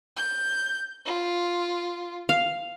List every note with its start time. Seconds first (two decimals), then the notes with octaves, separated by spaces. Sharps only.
0.17 G6
1.06 F4
2.29 F5